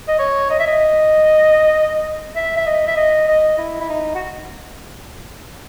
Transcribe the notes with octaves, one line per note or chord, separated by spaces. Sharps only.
D#5
C#5
D#5
E5
D#5
E5
E5
D#5
E5
D#5
D#5
E4
E4
D#4
F#4